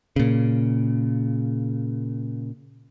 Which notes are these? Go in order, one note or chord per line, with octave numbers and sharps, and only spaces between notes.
A#2 C#3